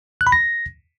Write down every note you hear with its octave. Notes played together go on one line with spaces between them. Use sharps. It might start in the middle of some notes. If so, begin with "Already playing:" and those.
F#6
B5
A#6